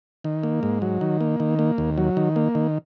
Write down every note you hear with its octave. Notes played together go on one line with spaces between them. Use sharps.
D#3
A#3
G#2
F#3
D#3
A#3
D#3
A#3
D#2
F#3
D#3
A#3
D#3